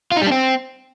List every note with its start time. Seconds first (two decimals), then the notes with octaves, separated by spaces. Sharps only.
0.12 F4
0.17 D#4
0.22 G3
0.27 D4
0.32 C4